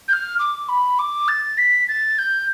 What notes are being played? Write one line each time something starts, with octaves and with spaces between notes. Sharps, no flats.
G6
F6
D6
B5
D6
A6
B6
A6
G6